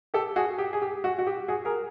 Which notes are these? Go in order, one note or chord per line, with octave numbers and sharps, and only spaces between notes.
G4 A4
F#4 G#4
G4
G#4
G4
F#4
F#4
G4
F#4 G#4
G#4 A#4